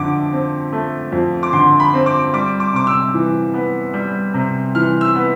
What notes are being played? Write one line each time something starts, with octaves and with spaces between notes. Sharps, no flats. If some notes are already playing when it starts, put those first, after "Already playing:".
Already playing: F2 D3 D6
C4
A3
F2
D6
D3 C6
B5
C4
D6
G3 D6
D6
C3 D6
E6
E3
B3
G3
C3
E3 F6
E6
B3